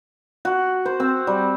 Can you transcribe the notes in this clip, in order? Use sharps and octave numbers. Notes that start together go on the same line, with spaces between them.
F#4
C5
C4
G3